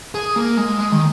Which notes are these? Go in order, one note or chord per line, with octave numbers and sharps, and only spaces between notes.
G#4
A#3
G#3
G#3
D#3